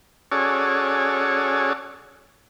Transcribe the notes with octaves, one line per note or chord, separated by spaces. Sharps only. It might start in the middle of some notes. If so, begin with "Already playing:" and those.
C#4 F#4 G#4 A4 C#5 D5